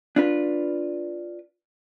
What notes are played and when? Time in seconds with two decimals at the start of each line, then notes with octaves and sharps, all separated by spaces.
0.16 D4 F4 B4